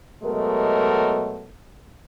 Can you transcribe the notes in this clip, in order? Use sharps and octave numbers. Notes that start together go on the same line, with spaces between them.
B2 F#3 G#3 A3 A#4